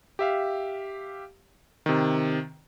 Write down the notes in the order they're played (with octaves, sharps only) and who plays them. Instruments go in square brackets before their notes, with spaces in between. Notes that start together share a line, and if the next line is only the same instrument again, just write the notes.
[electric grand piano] G4 E5 F5
C3 D#3